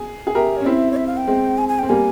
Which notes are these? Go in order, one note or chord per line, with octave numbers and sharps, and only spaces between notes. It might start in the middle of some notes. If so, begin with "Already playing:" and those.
Already playing: G#4
G#4
G4 A#4 E5
C#5
C#4
C4 E4 E5
C#5
E5
F5
G5
G#3 C4
G#5
G#5
C4 G5
G3 A#3 G#5